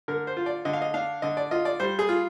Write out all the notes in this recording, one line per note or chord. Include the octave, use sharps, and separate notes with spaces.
D3 A#4
C5
F4
D5
D3 D#5
F5
D#5
D4 F5
D3 D#5
D5
F4 D#5
D5
G3 C5
G#4
F4